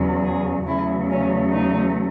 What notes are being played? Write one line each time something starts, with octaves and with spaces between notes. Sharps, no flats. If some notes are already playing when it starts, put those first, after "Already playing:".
Already playing: E2 C#3 F#3
G#4
E2 C#3 F#3 A3 E4
C#4
D#4